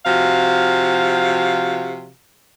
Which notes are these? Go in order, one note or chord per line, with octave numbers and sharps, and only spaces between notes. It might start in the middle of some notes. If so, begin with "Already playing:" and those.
C3 F3 F#4 F5